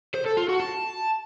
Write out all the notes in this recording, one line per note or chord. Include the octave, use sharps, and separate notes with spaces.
C5
A4
F4
F#4
A5